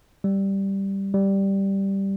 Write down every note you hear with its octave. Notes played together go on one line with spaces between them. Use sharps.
G3
G3